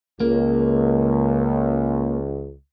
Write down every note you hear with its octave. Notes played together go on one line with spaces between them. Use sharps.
C#2 A#3